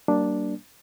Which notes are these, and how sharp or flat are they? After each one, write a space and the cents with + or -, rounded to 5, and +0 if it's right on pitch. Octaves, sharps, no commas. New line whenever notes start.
G3 -40 A#3 +0 D4 +0